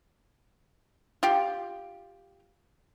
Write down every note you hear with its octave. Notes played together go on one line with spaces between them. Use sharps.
F4 G4